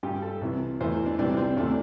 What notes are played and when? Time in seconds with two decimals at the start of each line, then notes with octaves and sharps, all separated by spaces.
0.03 G2 G3 G4
0.22 A4
0.41 C2 C3 E3
0.81 E2 E3 A3 C5
1.06 D4
1.18 C2 C3 E3 G3 D4
1.37 C4
1.57 E2 C3 A3 D4